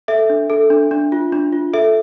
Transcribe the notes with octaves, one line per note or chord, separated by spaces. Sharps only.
A4 E5
D4
A4
D4
D4
F4
D4
F4
A4 E5